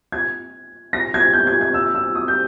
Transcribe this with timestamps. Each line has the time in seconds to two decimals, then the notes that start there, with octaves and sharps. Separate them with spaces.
0.12 G#6
0.93 A#6
1.14 G#6
1.33 G6
1.47 G#6
1.61 G#6
1.74 E6
1.95 E6
2.15 D#6
2.28 G6